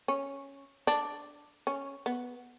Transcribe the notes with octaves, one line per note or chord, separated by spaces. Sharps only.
C#4
D4
C#4
B3